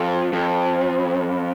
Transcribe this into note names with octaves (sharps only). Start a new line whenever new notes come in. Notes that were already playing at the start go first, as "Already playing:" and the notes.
Already playing: F2
F2